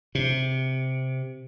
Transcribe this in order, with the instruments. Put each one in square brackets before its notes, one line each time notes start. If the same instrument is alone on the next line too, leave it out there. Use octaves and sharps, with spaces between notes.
[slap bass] C3